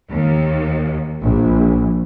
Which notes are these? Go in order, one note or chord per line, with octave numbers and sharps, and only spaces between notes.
D#2
A#1